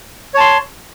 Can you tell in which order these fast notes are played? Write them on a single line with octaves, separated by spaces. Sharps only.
C#5 A5 C6